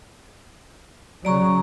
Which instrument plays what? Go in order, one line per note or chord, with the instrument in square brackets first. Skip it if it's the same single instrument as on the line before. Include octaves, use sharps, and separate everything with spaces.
[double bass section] C#3 F#3 [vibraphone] D5 A#5 C#6